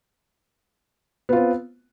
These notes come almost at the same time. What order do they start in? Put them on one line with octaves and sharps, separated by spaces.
B3 F4 C4